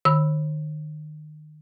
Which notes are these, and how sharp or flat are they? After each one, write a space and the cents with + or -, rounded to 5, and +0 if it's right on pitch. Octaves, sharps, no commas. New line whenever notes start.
D#3 -30 B5 +0 E6 +0